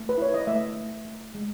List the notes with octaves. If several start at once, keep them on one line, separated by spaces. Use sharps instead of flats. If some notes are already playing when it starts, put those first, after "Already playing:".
Already playing: A3
B4
E4 C#5
D#5
A3 E5
A3
A3
G#3